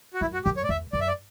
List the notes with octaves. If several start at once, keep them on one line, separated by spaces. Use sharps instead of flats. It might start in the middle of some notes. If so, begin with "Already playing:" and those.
F#4
F#2 E4
F#4
F#2 G4
C#5
D5
E2 E5
F#2 D5
E5
D5